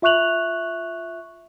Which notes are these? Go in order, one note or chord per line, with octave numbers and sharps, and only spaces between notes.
F4 E5 C#6 F#6 F7 F#7